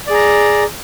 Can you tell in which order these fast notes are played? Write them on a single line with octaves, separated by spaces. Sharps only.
D5 G#4 A#5